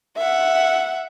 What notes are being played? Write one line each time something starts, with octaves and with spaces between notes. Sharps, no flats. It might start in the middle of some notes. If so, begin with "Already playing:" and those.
E5 F#5